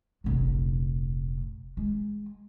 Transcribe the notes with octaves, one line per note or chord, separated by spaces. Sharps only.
F1 A#1
G#3